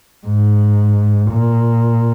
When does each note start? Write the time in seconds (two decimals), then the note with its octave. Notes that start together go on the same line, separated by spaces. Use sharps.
0.27 G#2
1.31 A#2